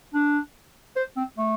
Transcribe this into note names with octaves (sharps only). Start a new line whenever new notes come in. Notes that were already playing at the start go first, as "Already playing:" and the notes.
D4
C5
C4
A3